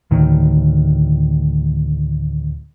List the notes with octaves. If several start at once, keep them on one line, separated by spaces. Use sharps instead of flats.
D2 A2 D#3